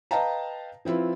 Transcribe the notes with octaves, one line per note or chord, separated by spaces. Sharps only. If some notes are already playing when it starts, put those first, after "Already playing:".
B4 D#5 F5 G5 A5 A#5
F3 C4 E4 F4 B4